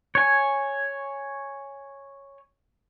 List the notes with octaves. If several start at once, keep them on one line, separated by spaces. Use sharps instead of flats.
C#5 G#5